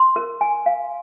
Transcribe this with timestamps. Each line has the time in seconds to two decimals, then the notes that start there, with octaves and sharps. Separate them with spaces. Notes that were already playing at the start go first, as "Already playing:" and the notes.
Already playing: C6
0.16 A#4
0.41 G#5
0.66 F5